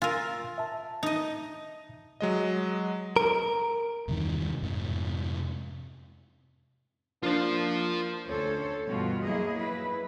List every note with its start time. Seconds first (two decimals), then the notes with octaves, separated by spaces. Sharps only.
0.02 F4 A#4 G#5 E6 A6
0.58 E5 A5
1.03 D#4 D#5
2.20 F#3 G#3 D#5
3.16 A#4 D7
4.08 E2 G2 C3 D#3
4.62 F2 G#2 C3
7.23 F3 A#3 D4 F4 C5
8.28 D2 C#4 A4 C5 C#5
8.87 G2 B2 E3 F4 F#4
9.23 F#3 A#3 E4 G#4 D#5
9.58 E4 B4